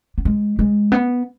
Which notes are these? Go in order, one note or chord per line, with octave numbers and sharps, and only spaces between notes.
B3
G#3
G#3
B3